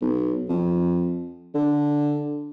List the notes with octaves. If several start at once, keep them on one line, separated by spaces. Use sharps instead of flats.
B1
F2
D3